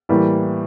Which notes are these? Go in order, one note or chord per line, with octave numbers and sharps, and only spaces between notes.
A2 E3 G3 A#3